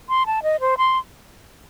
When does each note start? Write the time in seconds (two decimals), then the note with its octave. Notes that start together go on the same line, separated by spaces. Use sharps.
0.09 C6
0.26 A5
0.43 D#5
0.60 C5
0.78 C6